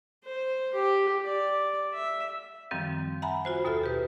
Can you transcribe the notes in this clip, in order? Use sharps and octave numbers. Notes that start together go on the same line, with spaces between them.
C5
G4
D5
E5
F#2 D#3 F3 G3 C4
E5 F#5 G#5 A#5 B5
F4 F#4 C5
D#2 B2 A4 E5 F6
G4 B4